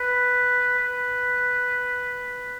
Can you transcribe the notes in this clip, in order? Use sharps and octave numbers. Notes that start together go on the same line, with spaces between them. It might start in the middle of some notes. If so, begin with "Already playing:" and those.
Already playing: B4
B4